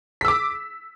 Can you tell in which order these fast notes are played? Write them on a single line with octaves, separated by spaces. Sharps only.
B6 E6 D6